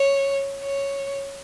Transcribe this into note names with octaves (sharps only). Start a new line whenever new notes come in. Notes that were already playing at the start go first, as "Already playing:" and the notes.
Already playing: C#5
C#5